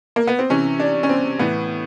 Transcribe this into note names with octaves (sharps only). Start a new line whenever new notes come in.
A#3
B3
C4
C3 E3 C#4
D4
C#4
C4
A2 E3 B3